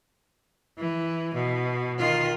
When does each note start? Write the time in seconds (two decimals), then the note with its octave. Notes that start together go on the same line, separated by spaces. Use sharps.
0.78 E3
1.34 B2
1.98 D#3 F4